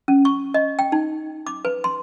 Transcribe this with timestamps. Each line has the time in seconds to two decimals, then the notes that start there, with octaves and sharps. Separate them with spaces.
0.08 C#4
0.25 C#6
0.54 D#5
0.79 G5
0.92 D#4
1.47 D6
1.65 B4
1.84 C6